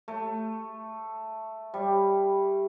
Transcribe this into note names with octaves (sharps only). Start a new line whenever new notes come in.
A3
G3